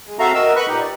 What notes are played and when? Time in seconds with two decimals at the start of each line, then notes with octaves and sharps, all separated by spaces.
0.07 G#3
0.19 C4 F#4 A4 E5 F5 A#5
0.34 F#4 A#4 D#5 E6
0.56 B4 B5 C#6 F#6
0.68 A#2 D#4 G4
0.80 D5